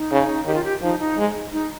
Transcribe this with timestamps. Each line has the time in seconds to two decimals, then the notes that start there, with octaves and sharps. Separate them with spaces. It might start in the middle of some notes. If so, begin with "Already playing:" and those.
Already playing: D#4
0.11 C#3
0.46 D#3 G4
0.55 F4
0.65 G4
0.82 F3 D#4
0.99 D#4
1.17 G#3
1.52 D#4